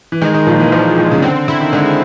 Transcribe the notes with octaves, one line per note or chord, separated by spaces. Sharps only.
E3
D#3 G#3
D#3
A#2 F3
E3
D#3 F3
A#2
C#3
D3 C4
D3 E4
D#3
D3 G#3